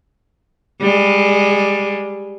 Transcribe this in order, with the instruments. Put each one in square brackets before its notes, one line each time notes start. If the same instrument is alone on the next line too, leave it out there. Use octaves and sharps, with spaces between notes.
[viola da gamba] G3 G#3